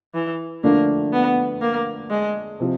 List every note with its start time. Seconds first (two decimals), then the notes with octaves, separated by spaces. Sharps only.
0.15 E3
0.64 D3 F3 A3 A#3 D4
1.13 B3
1.61 A#3
2.10 G#3
2.60 C3 F3